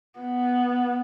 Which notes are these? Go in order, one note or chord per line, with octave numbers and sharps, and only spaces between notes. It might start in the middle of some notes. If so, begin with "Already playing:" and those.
B3